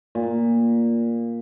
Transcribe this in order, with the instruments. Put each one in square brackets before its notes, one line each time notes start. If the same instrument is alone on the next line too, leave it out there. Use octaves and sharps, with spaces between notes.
[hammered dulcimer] A#2